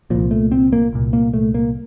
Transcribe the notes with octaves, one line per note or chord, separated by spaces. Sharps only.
C2 A#2 F3
A3
C4
A#3
C2 A#2
A#3
A3
A#3